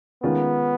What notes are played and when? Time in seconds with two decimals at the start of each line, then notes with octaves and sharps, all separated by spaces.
0.23 D#3 G#3 B3 C#4 F4